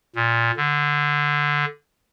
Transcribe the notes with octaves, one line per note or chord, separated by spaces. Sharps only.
A#2
D3